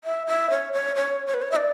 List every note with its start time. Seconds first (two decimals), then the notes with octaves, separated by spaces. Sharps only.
0.04 E5
0.27 E5
0.50 C#5
0.73 C#5
0.96 C#5
1.27 C#5
1.34 B4
1.42 C#5
1.51 E5
1.56 D5